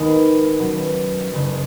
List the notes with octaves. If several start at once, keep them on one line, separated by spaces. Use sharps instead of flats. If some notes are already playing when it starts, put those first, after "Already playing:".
Already playing: D#2 D#3 G#3 B3 D#4
B2 F#3 C#4
F#1 F#2 C#3